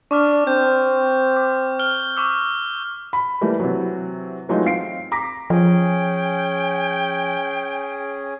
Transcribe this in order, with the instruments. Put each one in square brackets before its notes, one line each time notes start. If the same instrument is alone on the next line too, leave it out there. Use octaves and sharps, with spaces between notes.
[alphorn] D4 [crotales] C#6 D6 F6
[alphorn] C4 [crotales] G6
[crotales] D6
F6 G7
C#6 D6 E6
[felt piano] B5
E3 G3 A3 A#3
C3 E3 F#3
E3 F#3 G#3 A3 D#4 F4
C4 F5 C7 D7
A#5 D6 A#6 B6
[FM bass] F3 [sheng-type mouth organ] C#4 G#4 [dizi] G5